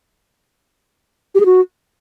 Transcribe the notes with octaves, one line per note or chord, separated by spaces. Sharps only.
G4
G#4
F#4